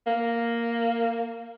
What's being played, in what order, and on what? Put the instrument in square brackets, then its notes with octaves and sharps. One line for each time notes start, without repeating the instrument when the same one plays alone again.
[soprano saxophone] A#3